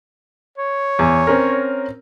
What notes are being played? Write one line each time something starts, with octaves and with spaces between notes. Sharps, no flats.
C#5
E2
C4 C#4 A#4